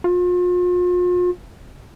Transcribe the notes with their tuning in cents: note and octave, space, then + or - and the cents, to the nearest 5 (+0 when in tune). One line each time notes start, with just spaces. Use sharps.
F4 +40